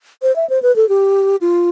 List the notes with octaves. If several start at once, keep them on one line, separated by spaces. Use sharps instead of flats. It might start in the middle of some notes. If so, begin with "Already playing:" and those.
C5
E5
C5
B4
A4
G4
F4